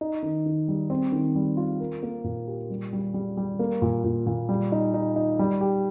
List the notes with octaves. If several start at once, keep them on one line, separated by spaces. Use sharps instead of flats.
D#4
D#3
D#3
G3
C4
D#3
G3
F4
A#4
A#3
A#2
G4
G3
G3
G3
G3
A#3
A#2
A#2
A#2
G3
D#4
D#4
D#4
G3
G4